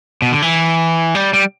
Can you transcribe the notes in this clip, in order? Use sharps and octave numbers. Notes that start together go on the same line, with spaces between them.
B2
D3
E3
G3
G3